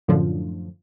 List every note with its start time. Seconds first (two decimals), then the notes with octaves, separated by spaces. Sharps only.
0.08 F#2 A2 D3 F3